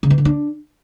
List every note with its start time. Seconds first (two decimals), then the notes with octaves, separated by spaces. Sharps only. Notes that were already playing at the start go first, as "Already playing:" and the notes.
0.03 C#3
0.10 E3
0.18 D3
0.25 D4